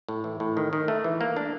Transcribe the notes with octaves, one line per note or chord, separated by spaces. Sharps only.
A2
E3
A2
D#3
D#3
A3
E3
A#3
D4